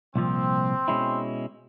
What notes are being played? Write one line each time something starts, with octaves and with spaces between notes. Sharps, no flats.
C2 A#2 F3 C4
B2 G#3 C#4 E4